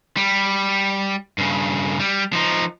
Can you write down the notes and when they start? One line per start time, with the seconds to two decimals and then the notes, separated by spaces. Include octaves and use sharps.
0.17 G3
1.38 G2 C#3
1.99 G3
2.33 F3 D#4